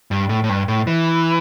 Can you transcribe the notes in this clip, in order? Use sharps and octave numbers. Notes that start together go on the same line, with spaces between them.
G2
A2
A2
G2
A2
E3